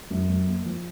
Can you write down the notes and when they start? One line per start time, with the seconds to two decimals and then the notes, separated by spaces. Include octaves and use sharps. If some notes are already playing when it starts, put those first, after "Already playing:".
0.11 F#2
0.29 F#2
0.47 A#3
0.66 F3